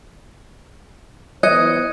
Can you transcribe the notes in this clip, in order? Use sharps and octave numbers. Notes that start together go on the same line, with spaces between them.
E3 B3 C5 D#5 F#6 G#6 C#7